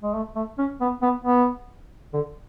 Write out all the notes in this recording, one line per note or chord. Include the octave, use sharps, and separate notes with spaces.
G#3
A3
A3
C#4
B3
B3
B3
D3